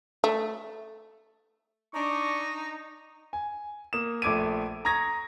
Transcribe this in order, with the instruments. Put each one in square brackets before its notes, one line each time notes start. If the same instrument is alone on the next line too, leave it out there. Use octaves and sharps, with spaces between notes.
[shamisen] A3
[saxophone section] D4 [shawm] D#4 [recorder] A#5 [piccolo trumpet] C#6
[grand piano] G#5
A#3 D#6 E7
A#1 A3 D6 G#6 D7 D#7
A#5 C#6 D#6 G#6 A#6